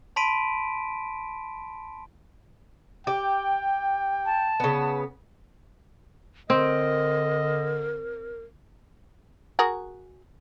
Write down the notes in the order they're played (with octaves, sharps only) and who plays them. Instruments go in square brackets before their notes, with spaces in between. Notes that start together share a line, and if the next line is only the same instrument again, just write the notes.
[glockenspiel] A5 B5 C6 B6 D7 D#7
[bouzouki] G4 [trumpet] G5
[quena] A5
[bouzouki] C#3 B3
[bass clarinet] D3 [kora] C4 [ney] A#4 [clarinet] D#5
[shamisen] F#4 G#4 A#4